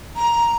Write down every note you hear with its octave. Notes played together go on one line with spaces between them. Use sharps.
A#5